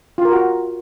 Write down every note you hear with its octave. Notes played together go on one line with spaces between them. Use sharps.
F4
A#4
F#4